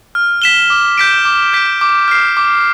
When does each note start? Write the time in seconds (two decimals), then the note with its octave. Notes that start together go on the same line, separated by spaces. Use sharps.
0.15 F6
0.42 B6 E7 G7
0.70 D6
0.98 G6 B6 D7
1.25 D6
1.54 G6 B6 D7
1.81 D6
2.08 F6 C7
2.37 D6